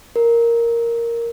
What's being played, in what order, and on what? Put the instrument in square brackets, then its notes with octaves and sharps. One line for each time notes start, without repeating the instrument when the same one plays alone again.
[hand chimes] A#4